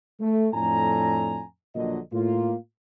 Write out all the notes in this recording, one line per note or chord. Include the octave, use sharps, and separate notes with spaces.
A3
F2 A2 D4 A4 G#5 A#5
A#1 A#2 D3 F#3 D#5
A2 A#3 F4